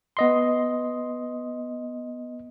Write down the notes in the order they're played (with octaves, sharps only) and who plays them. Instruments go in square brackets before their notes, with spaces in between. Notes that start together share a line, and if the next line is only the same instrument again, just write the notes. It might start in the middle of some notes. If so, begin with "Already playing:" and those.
[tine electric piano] B3 D#5 C6